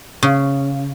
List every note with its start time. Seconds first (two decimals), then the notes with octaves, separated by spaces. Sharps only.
0.23 C#3